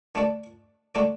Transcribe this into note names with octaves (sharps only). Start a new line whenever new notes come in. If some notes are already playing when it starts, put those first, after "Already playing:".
D3 A3 D4 A4 D5
D3 A3 D4 A4 D5